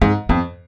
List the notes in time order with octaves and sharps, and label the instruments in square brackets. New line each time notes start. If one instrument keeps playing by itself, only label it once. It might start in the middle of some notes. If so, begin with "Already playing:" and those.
[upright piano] G#2 [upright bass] C4
[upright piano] F2 [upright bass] B3